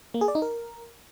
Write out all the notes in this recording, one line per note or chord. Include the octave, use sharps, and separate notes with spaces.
A#3
G#4
D5
D#4
A#4